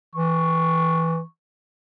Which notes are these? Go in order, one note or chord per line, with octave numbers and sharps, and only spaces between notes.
E3 C#6